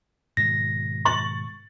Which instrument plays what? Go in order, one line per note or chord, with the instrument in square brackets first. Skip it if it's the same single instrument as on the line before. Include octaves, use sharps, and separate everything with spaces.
[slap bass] G#2 B2 D#3 [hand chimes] A#6
[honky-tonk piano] C#6 A6 F#7